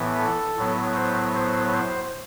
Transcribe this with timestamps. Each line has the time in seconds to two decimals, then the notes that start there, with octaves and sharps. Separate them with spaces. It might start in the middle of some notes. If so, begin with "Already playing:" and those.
Already playing: A2 E3 B3
0.18 A4
0.57 A2 F#3 B3
0.96 C5
1.35 C5
1.73 C5